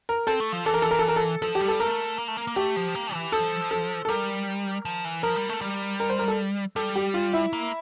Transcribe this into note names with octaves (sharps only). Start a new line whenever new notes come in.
A#4
C4 A4
A3
F3
E3 A4
A#4
A4
A#4
A4
A#4
A4
F3 A4
G4
G3
A4
A3 A#4
A#3
A3
A#3
A#3
A3 G4
F3
A#3
E3
F3 A4
A4
A4
G3 A#4
F3
E3
F3 A#4
G3
A3
G3
A#4
C5
A#4
A4
G3 A4
G4
F4
E4
A#3